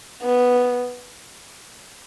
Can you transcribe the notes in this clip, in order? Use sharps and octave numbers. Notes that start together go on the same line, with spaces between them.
B3